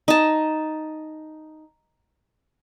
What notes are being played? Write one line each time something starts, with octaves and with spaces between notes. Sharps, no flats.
D#4 A5